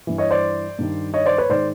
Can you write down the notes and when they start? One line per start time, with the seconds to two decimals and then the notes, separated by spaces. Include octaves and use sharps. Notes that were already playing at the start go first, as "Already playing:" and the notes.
0.07 G2 E3
0.18 C#5 D#5
0.31 C5 D5
0.78 G2 D#3
1.14 C#5 D#5
1.26 C5 D5
1.38 B4 C#5
1.49 G#2 D#3 C5 D5